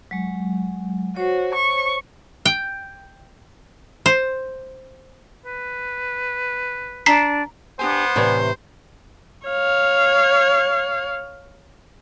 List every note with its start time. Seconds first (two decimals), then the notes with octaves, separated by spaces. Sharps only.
0.11 F#3 G#3
1.16 F#4 C5 C#5
1.54 C#6
2.46 G5
4.06 C5
5.46 B4
7.06 D4 A#5 B6 C7
7.79 B3 D4 G4 C5 G#5
8.16 A2 C3 E3 C#5 D5 G#5
9.47 C#5 F5